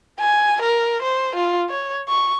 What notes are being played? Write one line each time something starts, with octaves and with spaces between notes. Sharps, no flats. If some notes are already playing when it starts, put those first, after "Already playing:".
G#5
A#4
C5
F4
C#5
C#6